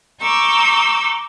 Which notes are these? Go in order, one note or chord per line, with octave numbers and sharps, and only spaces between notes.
A#5 C#6 D6 E6 G6